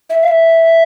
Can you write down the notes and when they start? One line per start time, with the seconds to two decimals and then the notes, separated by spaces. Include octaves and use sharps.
0.10 E5
0.23 F5
0.28 E5